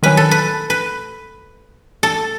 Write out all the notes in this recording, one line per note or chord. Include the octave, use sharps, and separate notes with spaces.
D#3 F#3 C#4 B4
A4
B4
B4
A4